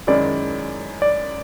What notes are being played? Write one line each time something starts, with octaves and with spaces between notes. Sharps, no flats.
F#2 D#3 G#3 C#4 E4 D5
D5